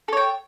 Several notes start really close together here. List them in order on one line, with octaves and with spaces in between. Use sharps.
A4 C#5 G5